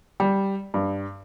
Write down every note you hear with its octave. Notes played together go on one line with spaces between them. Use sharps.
G3
G2